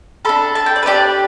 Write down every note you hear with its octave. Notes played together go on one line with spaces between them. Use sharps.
D4 A4 B5
A5
G5
D5
B4
D4 G4 D5